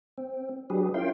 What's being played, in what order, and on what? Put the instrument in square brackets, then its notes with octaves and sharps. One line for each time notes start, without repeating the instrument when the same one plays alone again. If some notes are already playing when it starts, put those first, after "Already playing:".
[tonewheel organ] C4
F#3 D4 G4 G#4 B4
C#4 E4 F4 A#4 G5 C6